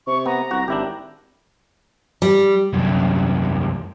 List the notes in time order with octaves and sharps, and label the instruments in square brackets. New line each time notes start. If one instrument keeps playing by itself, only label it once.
[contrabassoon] C3 [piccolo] C#6
[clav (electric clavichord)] B3 [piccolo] A#5
[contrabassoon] C2 [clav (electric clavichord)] F#4
[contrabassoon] G#1 [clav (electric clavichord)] D4 E4 G4
[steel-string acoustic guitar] G3
[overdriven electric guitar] C2 F#2